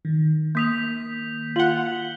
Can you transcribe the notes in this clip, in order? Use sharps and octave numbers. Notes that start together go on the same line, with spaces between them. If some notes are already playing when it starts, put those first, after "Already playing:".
D#3
A#3 D#6 G6 B6 F7
F4 F#5 F#7 G7